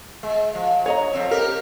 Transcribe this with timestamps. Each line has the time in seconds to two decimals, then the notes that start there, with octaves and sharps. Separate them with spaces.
0.23 G#3
0.55 F3
0.86 C#5 D#5 A#5
1.13 F2 C4
1.31 G4 A#4